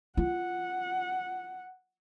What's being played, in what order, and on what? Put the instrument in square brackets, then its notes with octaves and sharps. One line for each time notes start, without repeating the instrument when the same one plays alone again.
[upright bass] F4 [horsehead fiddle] F#5